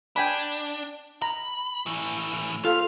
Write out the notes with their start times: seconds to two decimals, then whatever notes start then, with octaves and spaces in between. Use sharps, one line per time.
0.16 D4 G5 G#5 B5
1.22 A#5 B5
1.86 A2 E3
2.65 F4 A4 F5